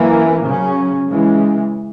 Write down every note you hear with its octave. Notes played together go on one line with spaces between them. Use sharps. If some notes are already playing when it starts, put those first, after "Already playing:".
Already playing: F#2 E3 A#3
C#3 F#3 C#4
C#3 E3 G#3